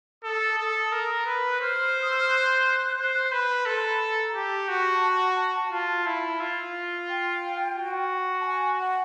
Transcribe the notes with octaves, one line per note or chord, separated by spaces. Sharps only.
A4 D#6
A4
A#4
B4
F#6
C5 F6
D#6
E6
F6
F#6
C5
B4
A4 C6
A#5
B5
A#5
G4 A5
F#4
F4
E4
F4
G5
F#4
A5
G#5
F#5